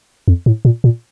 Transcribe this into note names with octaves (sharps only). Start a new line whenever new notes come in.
F2
A2
A#2
A#2